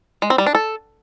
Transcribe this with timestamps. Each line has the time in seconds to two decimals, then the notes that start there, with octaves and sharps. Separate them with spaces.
0.22 G#3
0.30 C4
0.38 G3
0.46 D4
0.55 A4